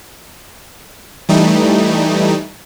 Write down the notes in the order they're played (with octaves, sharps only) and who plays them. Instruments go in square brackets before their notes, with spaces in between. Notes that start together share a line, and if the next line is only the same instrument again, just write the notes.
[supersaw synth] E3 G3 A3 D#4